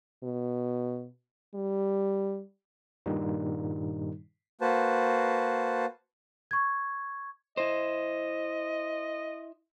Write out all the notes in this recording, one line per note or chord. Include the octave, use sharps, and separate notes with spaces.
B2
G3
G2 A#2 D#3 G3 D#4
A#3 F#4 B4 C5 A5
C#6 G#6
E4 C5 D#5